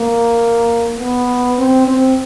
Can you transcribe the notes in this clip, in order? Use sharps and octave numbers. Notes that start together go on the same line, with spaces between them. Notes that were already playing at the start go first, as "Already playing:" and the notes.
Already playing: A#3
B3
C4
C4